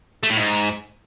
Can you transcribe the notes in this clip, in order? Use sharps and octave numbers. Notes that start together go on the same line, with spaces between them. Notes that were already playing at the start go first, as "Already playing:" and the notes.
A3
A2
G#2